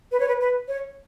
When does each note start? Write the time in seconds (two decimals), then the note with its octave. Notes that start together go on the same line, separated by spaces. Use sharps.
0.12 B4
0.20 C#5
0.28 B4
0.41 B4
0.68 C#5